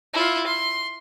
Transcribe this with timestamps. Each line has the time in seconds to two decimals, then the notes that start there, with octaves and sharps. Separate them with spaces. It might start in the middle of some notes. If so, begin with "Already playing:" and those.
0.13 E4 F4
0.47 C6